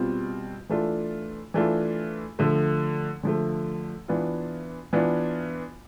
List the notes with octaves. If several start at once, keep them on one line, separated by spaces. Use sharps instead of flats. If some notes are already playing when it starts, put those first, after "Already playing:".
Already playing: B2 G3 C4 F4
E3 A3 D4 F4
E3 A3 D4 F4
D3 F3 A3
D3 F3 A3
E3 B3 D4 F4
E3 B3 D4 F4